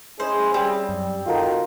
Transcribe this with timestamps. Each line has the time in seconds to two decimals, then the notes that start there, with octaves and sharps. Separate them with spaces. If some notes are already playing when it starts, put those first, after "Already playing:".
0.20 G#3 C#4 E4 G#4 C5
0.54 G3 C4
0.89 F#2
1.26 D#3 F4 F#4 A4 A#4